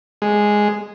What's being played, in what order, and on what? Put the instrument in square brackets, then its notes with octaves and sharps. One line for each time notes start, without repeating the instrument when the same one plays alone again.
[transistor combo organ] G#3